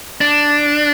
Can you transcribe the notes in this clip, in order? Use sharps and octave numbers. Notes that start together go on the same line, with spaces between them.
D4